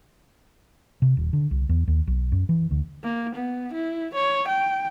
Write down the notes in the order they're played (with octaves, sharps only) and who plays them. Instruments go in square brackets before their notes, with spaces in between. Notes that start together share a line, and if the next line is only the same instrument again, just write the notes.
[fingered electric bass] C3
D#1
D3
C2
E2
D#2
B1
F#2
E3
D2
[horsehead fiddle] A#3
B3
E4
C#5
G5